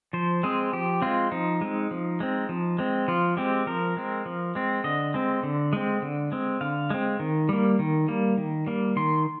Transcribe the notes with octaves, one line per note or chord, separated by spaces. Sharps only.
F3 C5
G#3 C4 G#4
F3 G4
G#3 C4 F4
F3 D#4
G#3 C4
F3
G#3 C4
F3
G#3 C4
F3 F4
G#3 C4 G4
F3 A#4
G#3 C4
F3
G#3 C4
D3 D#5
G#3 C4
D3
G#3 C4
D3
G#3 C4
D3 F5
G#3 C4
D#3
G3 A#3
D#3
G3 A#3
D#3
G3 A#3
D#3 C6